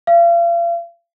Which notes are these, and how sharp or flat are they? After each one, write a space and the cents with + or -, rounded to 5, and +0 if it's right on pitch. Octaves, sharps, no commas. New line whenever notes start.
F5 -40